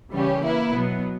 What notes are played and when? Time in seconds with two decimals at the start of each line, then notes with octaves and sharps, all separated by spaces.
0.12 C#3 E3 G3 C#4 G4
0.43 A#3 E4 B4
0.72 B2 F#3 B3